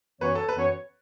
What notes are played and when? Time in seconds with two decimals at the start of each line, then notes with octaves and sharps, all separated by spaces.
0.21 F#2 E3 B3 F#4 B4 C#5
0.35 A4
0.49 B4
0.55 F#2 E3 B3 F#4 C#5